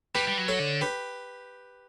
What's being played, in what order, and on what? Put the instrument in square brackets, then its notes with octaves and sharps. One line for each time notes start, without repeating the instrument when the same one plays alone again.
[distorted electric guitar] G3 [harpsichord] G4 B4
[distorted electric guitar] G3
F#3
[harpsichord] A4 C#5
[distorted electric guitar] D3
[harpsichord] G4 B4